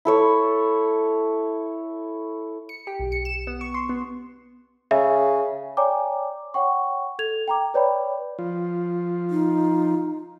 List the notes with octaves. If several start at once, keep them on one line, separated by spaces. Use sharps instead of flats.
E4 A4 C#5
C#7
G4
B1
C#7
E7
B3
C#6
C6
B3
C#3 E5
C#5 D5 G5 G#5 A#5 D6
C#5 F#5 G5 C#6
A4 G#6 F7
G5 A#5 D6
B4 C#5 D5 G5 B5
F3 F4
D#4